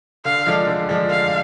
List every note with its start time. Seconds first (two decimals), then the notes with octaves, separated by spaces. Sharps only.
0.25 D3 F5
0.46 F3 G#3 D4 A4
0.67 D3
0.89 F3 G#3 D4 A4
1.09 D3 F5